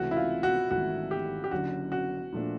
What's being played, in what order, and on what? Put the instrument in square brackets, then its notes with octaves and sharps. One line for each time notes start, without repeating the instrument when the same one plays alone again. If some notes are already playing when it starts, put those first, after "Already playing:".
Already playing: [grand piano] C#2 C3 E3 A3 C#4 [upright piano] F#4
[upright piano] E4
F4
F#4
[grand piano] G#1 G#2 E3 A3 [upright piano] F#4
[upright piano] G4
G4
[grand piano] F#1 F#2 D3 [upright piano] F#4
[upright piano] F#4
[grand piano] A#2 F3 A3 D4